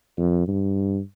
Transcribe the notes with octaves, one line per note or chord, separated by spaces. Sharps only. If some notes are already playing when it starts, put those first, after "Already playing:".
F2
G2